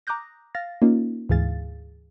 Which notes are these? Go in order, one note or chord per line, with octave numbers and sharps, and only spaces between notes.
A#5 D6 D#6 F#6 G6 A#6
F5 A6 A#6
A#3 C#4 D#4 F4
D2 G#2 E3 G#4 F5 A6